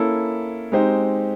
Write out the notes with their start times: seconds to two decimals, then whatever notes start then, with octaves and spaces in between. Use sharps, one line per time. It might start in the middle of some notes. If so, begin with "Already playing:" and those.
Already playing: A#3 C#4 E4 A4
0.72 G#3 C4 D#4 G4 C5